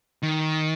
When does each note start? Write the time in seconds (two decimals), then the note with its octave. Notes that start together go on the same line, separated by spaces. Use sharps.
0.23 D#3